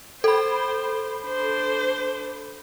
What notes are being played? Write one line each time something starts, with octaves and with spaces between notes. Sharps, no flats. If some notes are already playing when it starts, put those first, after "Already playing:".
A4 C5 B5
D4 C5